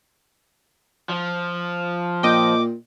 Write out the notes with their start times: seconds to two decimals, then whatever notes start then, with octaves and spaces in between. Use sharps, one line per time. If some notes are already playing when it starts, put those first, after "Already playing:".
1.09 F3
2.23 A#2 D#5 G5 D6